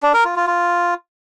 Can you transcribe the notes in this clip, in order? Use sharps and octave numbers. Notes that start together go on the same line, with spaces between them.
D4
A#4
F4
F4
F4